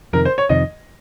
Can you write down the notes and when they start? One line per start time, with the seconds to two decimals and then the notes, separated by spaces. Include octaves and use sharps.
0.13 F2 C3 D#3 A#4
0.25 C5
0.38 C#5
0.49 F2 C3 D#3 D#5